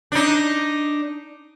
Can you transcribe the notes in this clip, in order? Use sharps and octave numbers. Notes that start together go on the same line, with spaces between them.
D4 D#4